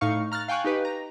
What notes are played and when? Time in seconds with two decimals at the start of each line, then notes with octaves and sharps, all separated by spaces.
0.01 A2 D#4 F5 C#6
0.32 A#5 F6 F#6 A6
0.48 F5 G5 G#5 C#6 F#6
0.64 D#4 G4 B4
0.85 A#5